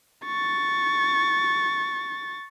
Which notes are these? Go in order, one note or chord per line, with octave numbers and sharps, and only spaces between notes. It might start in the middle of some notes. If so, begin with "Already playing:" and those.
C#6 A6